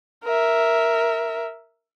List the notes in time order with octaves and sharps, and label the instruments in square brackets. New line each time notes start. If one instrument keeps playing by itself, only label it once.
[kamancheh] A#4 E5